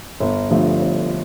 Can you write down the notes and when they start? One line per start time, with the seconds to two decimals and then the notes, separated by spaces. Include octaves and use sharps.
0.20 G1
0.50 G2 D3 F3 A3
0.80 G1